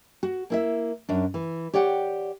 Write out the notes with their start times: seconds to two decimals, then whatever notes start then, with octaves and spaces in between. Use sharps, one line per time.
0.23 F#4
0.50 A#3 E4 E5
1.09 F#2 D4
1.34 E3
1.74 G4 C#5 D5 F#5 G5